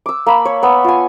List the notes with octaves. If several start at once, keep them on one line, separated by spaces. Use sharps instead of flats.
D6 E6
A#3 A5 B5
C#5
B3 E6
F4 G#5